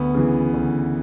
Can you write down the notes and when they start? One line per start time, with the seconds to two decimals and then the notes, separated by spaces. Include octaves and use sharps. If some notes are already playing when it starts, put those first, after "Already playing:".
Already playing: D2 B3
0.14 C#3 E3
0.54 D2